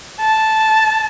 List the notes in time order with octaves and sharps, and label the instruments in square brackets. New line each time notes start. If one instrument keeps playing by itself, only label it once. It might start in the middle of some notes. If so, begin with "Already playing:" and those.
[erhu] A5